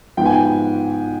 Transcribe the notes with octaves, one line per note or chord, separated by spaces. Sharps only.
G#2 F3 B3 G5
G#5
G5